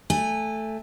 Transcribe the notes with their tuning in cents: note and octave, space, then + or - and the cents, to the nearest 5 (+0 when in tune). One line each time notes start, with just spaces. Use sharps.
A3 +0 G#5 -25